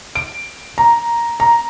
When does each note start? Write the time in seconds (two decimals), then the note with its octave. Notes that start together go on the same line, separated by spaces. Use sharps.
0.15 D7
0.78 A#5
1.40 A#5